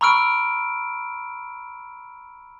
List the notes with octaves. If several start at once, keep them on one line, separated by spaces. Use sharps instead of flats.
A#5 B5 C#6 E6 F6 D7